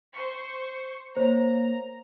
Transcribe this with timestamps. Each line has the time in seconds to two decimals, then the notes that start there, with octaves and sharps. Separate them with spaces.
0.12 C5 C#6
1.17 A#3 C5 C#5 A#5